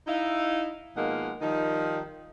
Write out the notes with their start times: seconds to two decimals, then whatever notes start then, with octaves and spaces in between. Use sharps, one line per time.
0.07 D#4 E4 F5
0.97 B2 F3 G#3 A#3 D#4 F#5
1.42 D#3 F3 G3 D#4